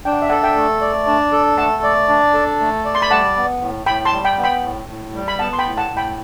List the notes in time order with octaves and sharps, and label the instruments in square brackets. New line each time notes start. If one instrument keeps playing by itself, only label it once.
[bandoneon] D4 [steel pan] G5
[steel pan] F#5
E5
[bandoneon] A4 [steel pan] D5 F#5
[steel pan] E5 G5
[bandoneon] A3
D5
D4
A4
[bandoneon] A3 [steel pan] F#5 A5
[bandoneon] D5
D4
A4
A3
D5
[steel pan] C6
B5
[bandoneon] G3 [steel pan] F#5 A5
[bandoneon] B3
A2
[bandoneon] A2 [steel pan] G5 B5
[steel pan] A5 C6
[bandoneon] G3
[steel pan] G5 B5
[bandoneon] B3
[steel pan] G5 B5
[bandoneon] A2
A2
G3
[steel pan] B5
[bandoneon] B3 [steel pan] F#5 A5
[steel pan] C6
G5 B5
[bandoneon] A2
[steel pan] F#5 A5
[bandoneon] A2
[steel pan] G5 B5